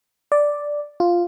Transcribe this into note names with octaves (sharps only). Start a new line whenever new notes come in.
D5
F4